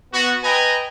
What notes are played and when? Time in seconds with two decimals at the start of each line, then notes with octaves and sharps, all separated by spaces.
0.13 B3 F#4
0.43 B4 D#5 G5 G#5 A#5 B5